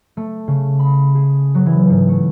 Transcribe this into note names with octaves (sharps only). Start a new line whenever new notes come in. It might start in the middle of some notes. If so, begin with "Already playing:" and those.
A3
C#3
B5
G#4
F#3
E3
G#2
A3